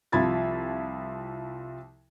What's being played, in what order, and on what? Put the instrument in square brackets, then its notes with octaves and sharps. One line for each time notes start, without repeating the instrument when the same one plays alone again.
[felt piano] C2 F3 B5 G#6 A6